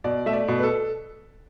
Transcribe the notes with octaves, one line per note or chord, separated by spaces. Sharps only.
B2 D5
A3 E5
D5
B2
B4
A4